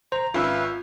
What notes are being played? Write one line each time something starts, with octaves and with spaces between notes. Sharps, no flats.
C5 A#5 F7
G#1 C#4 F4 B4 E5 F5 E6